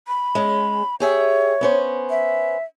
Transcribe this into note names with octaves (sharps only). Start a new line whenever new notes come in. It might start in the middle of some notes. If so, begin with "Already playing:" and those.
B5
G#3 C#4 G#4
G4 G#4 C#5 E5
B3 C#4 C5
E5